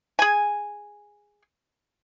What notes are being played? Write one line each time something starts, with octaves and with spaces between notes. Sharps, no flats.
G#4 G#5